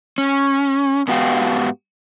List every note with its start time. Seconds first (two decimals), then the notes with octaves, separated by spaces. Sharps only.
0.18 C#4
1.08 G#2 B3 F#4 G4 F5